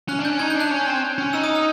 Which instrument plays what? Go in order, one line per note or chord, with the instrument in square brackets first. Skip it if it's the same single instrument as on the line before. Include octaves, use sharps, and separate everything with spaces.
[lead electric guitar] C#4 [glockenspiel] F#6
[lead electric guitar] D4
[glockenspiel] G6
[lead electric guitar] C#4
[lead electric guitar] D#4 [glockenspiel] G#6
[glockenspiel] G6
[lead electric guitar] D4 [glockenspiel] F#6
[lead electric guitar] C#4
C4
C#4
[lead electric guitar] D#4 [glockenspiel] E6
[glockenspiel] D#6
F6